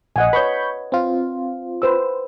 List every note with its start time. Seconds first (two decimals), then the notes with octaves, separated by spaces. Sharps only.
0.16 A#1 D#5 F#5 G#5
0.33 B4 C#5 B5 C#6 G6
0.92 C4 F4
1.82 B4 C5 E6